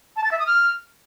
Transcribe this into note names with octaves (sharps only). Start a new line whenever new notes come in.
A5
A6
E5
D#6
F6